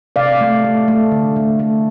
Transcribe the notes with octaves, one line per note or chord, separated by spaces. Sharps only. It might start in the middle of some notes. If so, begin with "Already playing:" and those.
C3 D5 F5
A3
A3
A3
D3
A3
A3